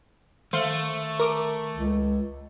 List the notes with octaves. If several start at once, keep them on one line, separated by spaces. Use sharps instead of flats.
D#3 A3 C5 F5
A#4 D6
C#2